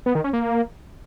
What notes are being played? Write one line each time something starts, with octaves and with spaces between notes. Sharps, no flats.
B3
D#3
C#4
A#3